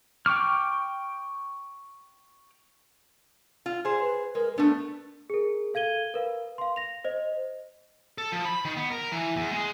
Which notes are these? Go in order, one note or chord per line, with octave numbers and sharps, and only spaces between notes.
G5 C#6 D6 F6
F4
G#4 C5
B4
G#3 A#4
A3 B3 D4
G#4 A#4
A4 F5 G#6 D#7 G7
A#4 B4 F5
F5 C6
A#6 F7
C5 D#5
A4
F3
B5
D#3
B3
A#4
E3
E2
G#3